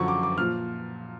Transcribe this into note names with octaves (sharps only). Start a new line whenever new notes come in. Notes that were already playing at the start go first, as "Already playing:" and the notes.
Already playing: F#2 D3 F3 C#6
D6
D6
A#2 F3 F6